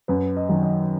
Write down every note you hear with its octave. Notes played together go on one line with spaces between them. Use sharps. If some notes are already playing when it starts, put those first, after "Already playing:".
F#2 B4
D#5
D#3 F#3
D#5